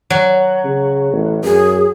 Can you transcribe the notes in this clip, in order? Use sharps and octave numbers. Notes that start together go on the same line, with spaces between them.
F#3
C#3
A1
F#2 G#4